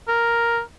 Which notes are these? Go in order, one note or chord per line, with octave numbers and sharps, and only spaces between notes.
A#4